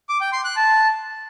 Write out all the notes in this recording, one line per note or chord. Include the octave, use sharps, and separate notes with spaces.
D6
G5
C6
F#6
A5